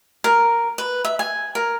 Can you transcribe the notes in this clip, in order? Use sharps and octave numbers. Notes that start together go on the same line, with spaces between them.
A#4
B4
E5
G#5
A#4